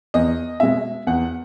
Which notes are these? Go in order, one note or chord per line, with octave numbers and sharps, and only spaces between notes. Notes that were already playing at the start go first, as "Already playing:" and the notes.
E2 D#5
B2 G#3 E5
E2 F#5